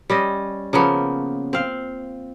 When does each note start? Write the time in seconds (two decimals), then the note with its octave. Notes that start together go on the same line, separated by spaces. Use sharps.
0.10 G3 C#4 D#5
0.73 C#3 F3 A#3 B3
1.53 C4 F5